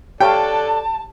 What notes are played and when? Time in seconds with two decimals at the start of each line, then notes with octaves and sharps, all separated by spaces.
0.20 G4 A4 C#5 D5 F5 G5 A5